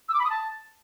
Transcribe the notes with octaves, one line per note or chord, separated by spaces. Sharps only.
E6
D6
B5
D#6
A5